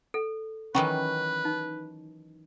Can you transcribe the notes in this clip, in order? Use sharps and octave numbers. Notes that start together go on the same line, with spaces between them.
A4
D#3 E3 F#3 C#4 B4 C#6
D#4